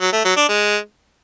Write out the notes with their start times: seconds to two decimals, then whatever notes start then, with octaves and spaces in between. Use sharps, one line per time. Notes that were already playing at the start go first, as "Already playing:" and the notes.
0.01 F#3
0.13 A3
0.25 F#3
0.37 D4
0.49 G#3